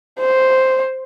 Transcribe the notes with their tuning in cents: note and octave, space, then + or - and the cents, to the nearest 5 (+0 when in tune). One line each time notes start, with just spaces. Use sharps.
C5 +0